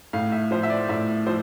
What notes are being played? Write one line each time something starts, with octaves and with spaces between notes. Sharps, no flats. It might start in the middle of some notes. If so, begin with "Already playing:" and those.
A2 F5
E5
F3 C5
E5
D5
A2 E5
F3 C5